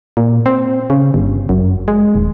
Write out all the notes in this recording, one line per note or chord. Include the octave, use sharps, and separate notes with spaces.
A#2
C4
C#3
G1
F#2
G#3
D#1